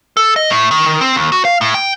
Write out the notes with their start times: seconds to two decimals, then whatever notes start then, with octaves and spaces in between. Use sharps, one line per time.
0.17 A4
0.36 D#5
0.50 A2
0.71 D#3
0.86 D#3
1.01 C4
1.16 D#2
1.32 F#4
1.45 F5
1.61 A2
1.74 G5